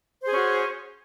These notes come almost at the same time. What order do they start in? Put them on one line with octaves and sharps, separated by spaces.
C5 G#4 C#4 F#4